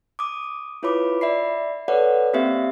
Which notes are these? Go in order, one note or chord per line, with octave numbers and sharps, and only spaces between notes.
D6 D#6
E4 F4 B4 C#5 B5 D6
D5 E5 B5 C7
A4 B4 C#5 D5 F#5
A#3 C4 G4 E5 F5